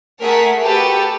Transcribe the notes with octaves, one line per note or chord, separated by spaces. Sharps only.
A3 G#4 A#4 F#5 B6
F#4 G4 A4 B4 F#5 A5